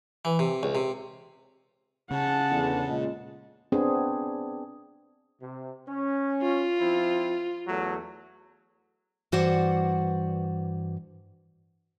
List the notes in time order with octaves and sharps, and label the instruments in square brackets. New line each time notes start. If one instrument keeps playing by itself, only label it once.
[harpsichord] E3
C3
C#2
C3
[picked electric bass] C#3 [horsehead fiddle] F#5 A5
[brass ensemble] E2 D3
A#2 G#3
[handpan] B3 C4 D4 G#4
[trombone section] C3
C#4
[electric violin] F4
[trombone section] F3 C4 E4
E2 F#3 A3
[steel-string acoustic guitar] G2 E3 F#4 C5 D5 F#5